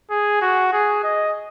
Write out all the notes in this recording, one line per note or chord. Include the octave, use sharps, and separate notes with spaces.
G#4
F#4
G#4
D#5